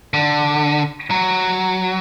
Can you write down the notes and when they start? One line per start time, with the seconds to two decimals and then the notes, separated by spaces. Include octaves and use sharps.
0.14 D3
1.10 F#3